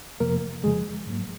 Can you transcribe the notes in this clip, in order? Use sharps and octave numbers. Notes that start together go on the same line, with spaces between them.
F2 C3 F3 A#3 A#4
F2 C#3 F3 G#3 G#4
G#2 F#3 A#3